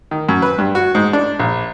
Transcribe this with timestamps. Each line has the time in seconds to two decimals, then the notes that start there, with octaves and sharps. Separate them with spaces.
0.11 D#3
0.29 F#2
0.42 B4
0.58 G2
0.75 F#4
0.95 G#2
1.13 D4
1.39 A#1